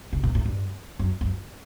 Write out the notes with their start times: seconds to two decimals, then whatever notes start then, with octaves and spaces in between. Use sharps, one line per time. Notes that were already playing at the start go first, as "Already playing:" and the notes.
0.13 C#3
0.23 B2
0.35 A2
0.45 G2
0.99 F#2
1.21 F#2